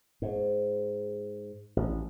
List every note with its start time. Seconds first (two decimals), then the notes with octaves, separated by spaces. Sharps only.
0.22 G#2
1.77 A1